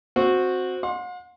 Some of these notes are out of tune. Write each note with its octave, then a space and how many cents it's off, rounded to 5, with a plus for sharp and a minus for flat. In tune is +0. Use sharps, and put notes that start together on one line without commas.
C4 +0 F#4 -10
F#5 -45 C6 +15